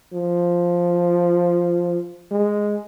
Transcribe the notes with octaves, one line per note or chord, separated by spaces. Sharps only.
F3
G#3